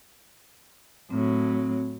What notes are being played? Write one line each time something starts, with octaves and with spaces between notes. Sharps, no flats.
A2 F#3 C4